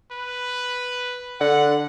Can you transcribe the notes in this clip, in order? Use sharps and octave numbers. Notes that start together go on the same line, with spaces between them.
B4
D3 F#5